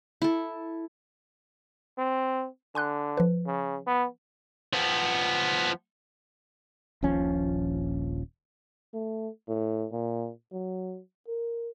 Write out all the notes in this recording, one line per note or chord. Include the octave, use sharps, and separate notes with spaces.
E4 A4
C4
D3 G#5 C6 F#6
F3 B4
C#3
B3
F3 B3
D#1 A#1 F3 C#4
A3
A2
A#2
F#3
A#4